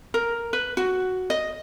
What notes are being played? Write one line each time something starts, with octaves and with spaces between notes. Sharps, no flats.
A#4
B4
F#4
D#5